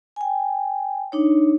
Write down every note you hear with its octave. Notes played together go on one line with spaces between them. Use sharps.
G5 G#5
D4 D#4 C#5